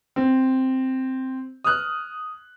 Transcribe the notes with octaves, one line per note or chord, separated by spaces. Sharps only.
C4
D#6 F6 F#6